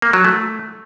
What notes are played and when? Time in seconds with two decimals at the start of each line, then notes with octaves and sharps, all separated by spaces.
0.02 A#3
0.13 F#3
0.25 A3